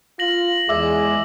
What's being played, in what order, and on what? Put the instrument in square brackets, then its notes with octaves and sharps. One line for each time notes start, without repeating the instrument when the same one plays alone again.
[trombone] F4 [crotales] A#6 F#7
[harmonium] E2 G#3 [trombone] G#4 [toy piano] D5 E5 [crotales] D6 E6 F#7